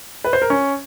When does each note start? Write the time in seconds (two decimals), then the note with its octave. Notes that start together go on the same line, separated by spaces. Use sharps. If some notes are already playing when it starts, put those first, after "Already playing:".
0.24 B4
0.33 C5
0.42 A#4
0.50 C#4